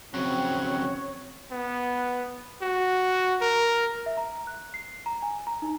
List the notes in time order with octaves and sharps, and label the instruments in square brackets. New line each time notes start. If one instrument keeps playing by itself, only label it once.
[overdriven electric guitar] F2 C#3 [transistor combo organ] F#3 C#4 F#4 [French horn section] C4 [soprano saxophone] C#5
[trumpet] B3
F#4
A#4
[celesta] E5
A#5
F#6
C7
A#5
G#5
A#5
D#4